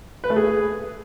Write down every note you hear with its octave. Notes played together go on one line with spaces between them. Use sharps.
B4
A3
G#4